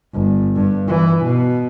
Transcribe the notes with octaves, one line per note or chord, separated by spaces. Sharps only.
G1
G2
E3
B2